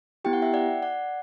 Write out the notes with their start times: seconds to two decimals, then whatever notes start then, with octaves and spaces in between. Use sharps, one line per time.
0.25 B3 E4 G4 G5
0.33 F#5
0.42 E5 G5
0.54 D5 F#5
0.83 D5 F#5